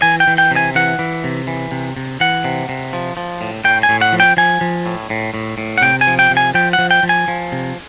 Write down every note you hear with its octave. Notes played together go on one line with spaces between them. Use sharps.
E3 G#5
G5
E3
G5
C3
G#5
E3 F#5
E3
C3
E3
C3
C3
E3 F#5
C3
C3
F3
F3
A2
A2 G5
G#5
A2
F#5
F3
G5
F3 G#5
F3
A2
A2
A2
A2
F#5
C3 G5
G#5
F3
G5
C3
G#5
F3 G5
F#5
F3
G5
F3
G#5
F3
C3